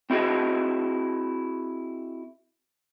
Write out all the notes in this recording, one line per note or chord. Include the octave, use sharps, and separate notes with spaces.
C4 E4 F#4 G#4 D#5